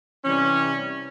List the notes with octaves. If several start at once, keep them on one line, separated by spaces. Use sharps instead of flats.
C3 E3 G3 C#4